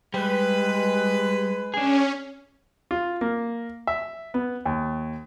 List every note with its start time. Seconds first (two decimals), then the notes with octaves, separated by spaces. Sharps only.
0.14 G3 G#3 B4
1.74 C#4 D4 G#4
2.91 F4
3.21 A#3
3.87 E5
4.34 B3
4.65 D#2